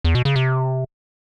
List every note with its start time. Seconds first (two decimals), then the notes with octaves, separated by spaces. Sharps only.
0.05 E2
0.15 B2
0.25 C#3
0.36 C3